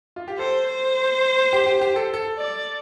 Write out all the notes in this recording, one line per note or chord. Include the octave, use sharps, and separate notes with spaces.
F4
G4
A4 C5
C5
G4
G4
G4
A4
A4
D5